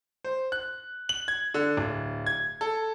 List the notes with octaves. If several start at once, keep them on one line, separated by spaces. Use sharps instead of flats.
C5
F#6
F#7
G#6
D3
D1
G#6
A4